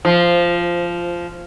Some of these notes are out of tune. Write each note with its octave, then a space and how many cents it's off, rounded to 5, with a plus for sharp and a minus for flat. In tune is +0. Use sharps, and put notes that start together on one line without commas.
F3 -10